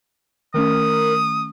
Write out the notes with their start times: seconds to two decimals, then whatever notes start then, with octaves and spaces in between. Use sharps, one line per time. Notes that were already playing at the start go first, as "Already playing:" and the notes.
0.54 D#3 A3 C#4 A#4 D#6